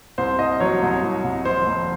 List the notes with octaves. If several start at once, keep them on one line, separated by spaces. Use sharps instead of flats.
C2 C5
C2 D#5
F#3 C#5
C2
C2
C2
F1 C5
F1